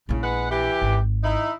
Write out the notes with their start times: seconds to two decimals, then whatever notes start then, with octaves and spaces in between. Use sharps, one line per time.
0.09 A#1 C#3 E4
0.23 G#3 B4 F#5
0.51 E3 G4
0.82 G#1
1.24 D#4 E4